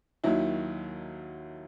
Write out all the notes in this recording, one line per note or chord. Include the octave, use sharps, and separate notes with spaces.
D#2 D#3 F#3 E4